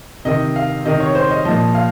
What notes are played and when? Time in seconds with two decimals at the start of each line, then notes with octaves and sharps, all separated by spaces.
0.25 C3 D#3 D#5
0.56 F5
0.85 C3 D#3 D#5
1.00 C#5
1.15 C5
1.31 D#5
1.45 A#2 F3 D#5
1.75 F5